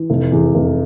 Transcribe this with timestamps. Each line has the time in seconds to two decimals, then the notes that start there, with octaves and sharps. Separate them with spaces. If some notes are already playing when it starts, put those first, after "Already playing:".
Already playing: E3
0.10 F1
0.32 E2
0.55 F1